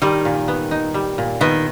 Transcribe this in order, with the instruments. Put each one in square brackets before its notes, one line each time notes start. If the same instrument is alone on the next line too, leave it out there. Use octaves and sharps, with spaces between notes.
[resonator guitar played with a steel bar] D#3 [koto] G3
[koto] A#2
B3
D#4
G3
A#2
[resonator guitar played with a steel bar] D#3 [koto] B3